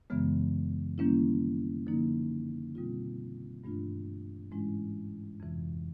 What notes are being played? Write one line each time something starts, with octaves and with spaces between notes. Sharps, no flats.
F#2 C#3 E3 G#3 B3
D#3 G3 A#3 C#4 E4
D3 F3 A#3 D#4
B2 G3 C4 F4
G2 E3 A3 D4 F4
G#2 E3 G#3 C#4 E4
F2 C3 E3